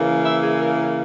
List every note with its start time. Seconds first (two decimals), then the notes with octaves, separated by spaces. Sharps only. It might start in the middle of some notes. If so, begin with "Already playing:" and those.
Already playing: C#3 E3 A#3
0.25 E5
0.43 G#4
0.61 A#4
0.74 G#4
0.79 A#4